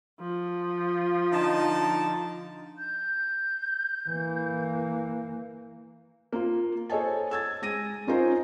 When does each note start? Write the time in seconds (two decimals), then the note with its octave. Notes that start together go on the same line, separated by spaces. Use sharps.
0.20 F3
1.33 D3 D#4 A5
2.78 G6
4.09 E3 A#3
6.32 A#3 F4
6.90 A4 C5 C#5 D#5 G#5 A5
7.31 E6 G#6 A6
7.62 G#3 A#6 D#7
8.07 C#4 D#4 F4 A#4 C5